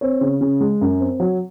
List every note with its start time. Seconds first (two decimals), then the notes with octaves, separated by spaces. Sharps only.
0.01 C4 C#5
0.21 C#3
0.41 C#3
0.60 G#3
0.81 F#2
1.00 C4
1.20 F#3